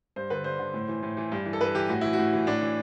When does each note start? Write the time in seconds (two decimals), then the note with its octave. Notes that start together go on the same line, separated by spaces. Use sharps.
0.16 G2 C5
0.30 D3 B4
0.44 G2 C5
0.59 D3
0.74 A2
0.88 E3
1.03 A2
1.17 E3
1.32 G2
1.46 E3
1.53 A4
1.61 G2 B4
1.75 E3 G4
1.89 A2 F#4
2.01 E3 E4
2.13 F#4
2.19 A2
2.33 E3
2.47 A2 D4
2.61 E3